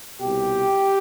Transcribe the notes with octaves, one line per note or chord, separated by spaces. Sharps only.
C2 B2 G4